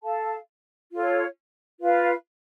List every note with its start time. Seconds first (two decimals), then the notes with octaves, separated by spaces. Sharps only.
0.02 A4 F5 A5
0.91 F4 A4 C#5
1.80 F4 B4 F5